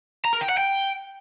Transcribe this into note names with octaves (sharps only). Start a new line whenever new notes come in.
A#5
A#4
G5
F#5
G5